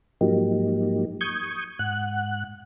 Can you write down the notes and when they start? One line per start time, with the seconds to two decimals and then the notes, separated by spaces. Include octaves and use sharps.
0.21 G#2 F3 F#3 A#3 D#4 G4
1.21 C#6 D#6 G6 G#6
1.79 G#2 F#5 F#6